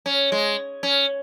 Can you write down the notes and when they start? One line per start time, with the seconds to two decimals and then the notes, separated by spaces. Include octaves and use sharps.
0.06 C#4
0.32 G#3
0.83 C#4